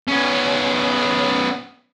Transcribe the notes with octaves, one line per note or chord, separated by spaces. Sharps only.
B3 C#4